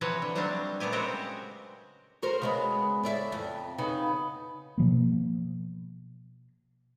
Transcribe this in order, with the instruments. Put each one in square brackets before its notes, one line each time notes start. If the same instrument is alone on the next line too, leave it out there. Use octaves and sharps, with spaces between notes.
[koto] C3 E3 F3 F#4 B4 C#5
D3
F#3 G3 A3 C4 D4
A#2 A3 B3 G4 G#5
C#3 G#3 C4 F#4 G4 A#4
[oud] F#4 A#4 C5
C#3 G#3 B3
A2 D5 E5
F2
C#3 B3 D#4
[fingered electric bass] B2 F3 A#3